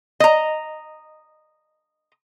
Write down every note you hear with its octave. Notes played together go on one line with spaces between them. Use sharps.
D#5 A#5